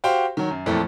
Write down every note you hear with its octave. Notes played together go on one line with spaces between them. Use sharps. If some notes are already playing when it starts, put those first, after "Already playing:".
F#4 G4 C5 F5 G5
D#3 F#3
F#2
F2 A#2 E3 A3